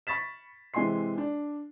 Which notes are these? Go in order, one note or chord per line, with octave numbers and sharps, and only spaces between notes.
B5 C#6 A6 B6 E7
C3 E3 G#3 G#5 C6 C7
D4